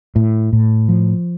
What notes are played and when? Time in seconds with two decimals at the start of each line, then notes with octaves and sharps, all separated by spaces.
0.16 A2
0.53 A2
0.89 F3